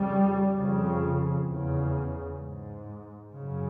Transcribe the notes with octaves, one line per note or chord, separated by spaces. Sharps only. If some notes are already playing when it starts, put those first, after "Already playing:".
Already playing: F2 C#3 G3
F2 C#3
E2 C#3
G#2
F#2 C#3